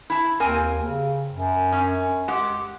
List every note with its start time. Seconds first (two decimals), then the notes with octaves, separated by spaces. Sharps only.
0.10 E4 A5
0.40 D#2 C4 A#4 G#5
0.82 C#3
1.31 F#2
1.72 C#4
2.28 G#3 G4 F#5